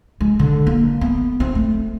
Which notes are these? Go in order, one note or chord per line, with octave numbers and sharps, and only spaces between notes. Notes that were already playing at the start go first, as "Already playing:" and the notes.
G#3
D3
A#3
B3
C4
A3